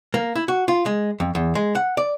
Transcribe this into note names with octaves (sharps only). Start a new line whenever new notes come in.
A#3
E4
F#4
F4
G#3
F2
E2
G#3
F#5
D5